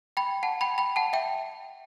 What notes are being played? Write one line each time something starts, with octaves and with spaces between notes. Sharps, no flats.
G5 B5
F#5 A5
G5 B5
G5 B5
F#5 A5
E5 G5